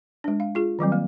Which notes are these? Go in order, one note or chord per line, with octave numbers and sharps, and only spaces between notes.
G#3 D4
F5
F4 G#4
D#3 F#3 G3 C4
A#3